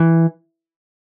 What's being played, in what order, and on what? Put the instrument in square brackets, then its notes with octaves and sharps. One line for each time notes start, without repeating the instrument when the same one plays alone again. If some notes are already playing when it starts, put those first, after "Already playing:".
Already playing: [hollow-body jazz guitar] E3